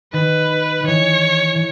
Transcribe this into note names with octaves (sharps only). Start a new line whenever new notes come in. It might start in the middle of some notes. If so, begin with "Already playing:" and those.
D#3 B4
D#3 E3 C#5
E3